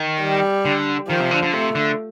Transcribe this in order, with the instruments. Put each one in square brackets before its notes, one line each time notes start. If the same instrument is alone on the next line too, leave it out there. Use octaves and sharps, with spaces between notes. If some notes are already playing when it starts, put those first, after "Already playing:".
Already playing: [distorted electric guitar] D#3
[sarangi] G3
[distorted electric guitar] D3
[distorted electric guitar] D#3 [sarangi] F3
[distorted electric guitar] C3
D3
D3
[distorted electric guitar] C3 [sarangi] A3
[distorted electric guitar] D3